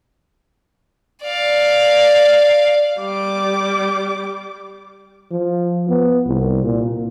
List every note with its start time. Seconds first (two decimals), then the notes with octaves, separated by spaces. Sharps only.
1.24 D5 F5
3.00 G3 D6
5.32 F3
5.89 B3
6.26 C2
6.63 A#2